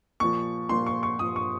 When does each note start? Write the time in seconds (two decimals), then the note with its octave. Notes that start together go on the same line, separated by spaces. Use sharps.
0.20 A#2 F3 C#6
0.69 A#2 F3 C6
0.86 C#6
1.03 C#6
1.19 A#2 F3 D#6
1.36 C#6